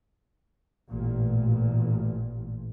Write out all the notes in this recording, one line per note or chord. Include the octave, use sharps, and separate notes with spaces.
A1 A#2